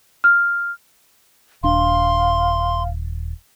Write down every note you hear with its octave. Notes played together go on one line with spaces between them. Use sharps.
F6
D#1 D4 F5 C6